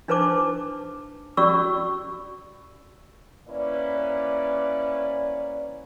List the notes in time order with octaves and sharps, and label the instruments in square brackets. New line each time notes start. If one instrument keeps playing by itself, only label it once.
[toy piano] D4 D#4 B4 C5 A5 D6
C#4 F#4 G4 D5 C#6 E6
[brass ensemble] A#3 C#4 E4 B4 D5